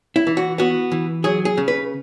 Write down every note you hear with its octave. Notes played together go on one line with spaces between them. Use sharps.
E4
E3
F#4
B3 F#4
E3
F#3 G#4
G#4
C#3
B4